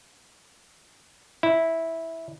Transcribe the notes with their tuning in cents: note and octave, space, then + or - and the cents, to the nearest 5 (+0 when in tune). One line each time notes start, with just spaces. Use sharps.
E4 -10